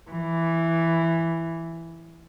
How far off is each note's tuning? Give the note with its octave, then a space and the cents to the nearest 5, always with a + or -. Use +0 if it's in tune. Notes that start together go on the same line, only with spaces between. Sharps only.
E3 +5